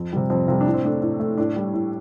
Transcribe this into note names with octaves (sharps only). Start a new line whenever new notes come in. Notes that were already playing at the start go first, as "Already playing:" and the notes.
Already playing: F2 C4
C3 G3
F2 C4
C3 G3 F4
D4
A2
C4
A3 D4
A2
A3
A2 D4
G3
A2